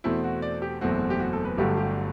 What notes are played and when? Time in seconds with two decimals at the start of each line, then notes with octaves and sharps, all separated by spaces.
0.04 E2 B2 A3 C4 E4
0.24 F#4
0.42 D5
0.62 G4
0.81 F#1 E2 B2 A3 C4 F#4
1.10 G4
1.20 F#4
1.33 A4
1.45 B4
1.57 G1 G2 D3 F#3 A3 G4
1.77 G4